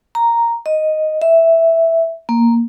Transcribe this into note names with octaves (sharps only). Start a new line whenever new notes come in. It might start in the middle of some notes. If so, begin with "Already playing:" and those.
A#5
D#5
E5
A#3